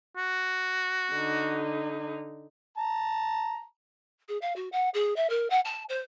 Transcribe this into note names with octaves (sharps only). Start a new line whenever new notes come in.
F#4
D3 D#4
A5 A#5
G#4
F5
F#4
F#5
G#4
E5
A#4
F#5
A5
C5